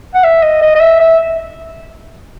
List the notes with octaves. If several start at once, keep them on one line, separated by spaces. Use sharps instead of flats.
F#5
E5
D#5
D#5
D#5
E5
E5